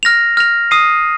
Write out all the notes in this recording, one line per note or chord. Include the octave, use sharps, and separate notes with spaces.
F6 A#6 F7
F6 A#6 F7
D#6 C7 D#7